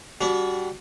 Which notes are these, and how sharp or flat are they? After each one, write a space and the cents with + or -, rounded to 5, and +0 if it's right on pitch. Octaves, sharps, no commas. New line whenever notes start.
G3 +0 D4 -45 F#4 +0